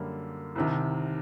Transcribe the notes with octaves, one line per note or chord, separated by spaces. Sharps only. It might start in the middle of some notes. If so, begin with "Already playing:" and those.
Already playing: F#2 D3 G3 A#3
C2 C3 D#3